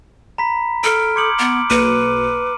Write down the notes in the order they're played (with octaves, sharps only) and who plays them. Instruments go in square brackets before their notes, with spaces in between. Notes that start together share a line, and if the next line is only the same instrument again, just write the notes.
[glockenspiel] A#5 B5 B6
[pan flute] A4 [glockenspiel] F6 D7
[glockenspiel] C6 C#7 F#7 [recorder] D6 [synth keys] D#6 G6 G#6
[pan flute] B3 [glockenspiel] D7
[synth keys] B1 A#3 C#7 [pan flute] B4 [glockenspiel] D#7